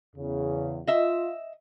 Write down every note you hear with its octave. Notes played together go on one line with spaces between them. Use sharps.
E2 C#3
F4 D#5 E5